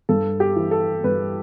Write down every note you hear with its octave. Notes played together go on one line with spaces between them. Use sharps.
G2 A4
G4
E3
A4
G2 B4